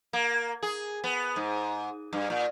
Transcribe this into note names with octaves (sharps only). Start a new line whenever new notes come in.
A#3
G#4
B3
G#2
G2
A#2